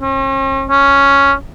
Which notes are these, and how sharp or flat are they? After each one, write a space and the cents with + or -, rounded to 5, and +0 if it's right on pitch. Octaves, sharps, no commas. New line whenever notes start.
C#4 -45
C#4 +5